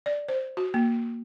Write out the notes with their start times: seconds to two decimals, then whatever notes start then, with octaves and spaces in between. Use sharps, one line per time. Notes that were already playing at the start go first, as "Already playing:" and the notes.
0.06 D5
0.28 C5
0.57 F#4
0.74 A#3